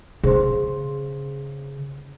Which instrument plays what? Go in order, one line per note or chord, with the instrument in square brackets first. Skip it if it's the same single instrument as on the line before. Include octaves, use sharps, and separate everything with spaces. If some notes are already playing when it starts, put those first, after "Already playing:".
[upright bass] C#3 [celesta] G#4 C5 C6